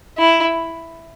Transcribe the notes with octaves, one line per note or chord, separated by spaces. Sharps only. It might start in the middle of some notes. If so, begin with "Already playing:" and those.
E4